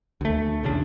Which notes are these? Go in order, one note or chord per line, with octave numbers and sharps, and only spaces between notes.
D2 A3
B1 E2 C#3 D4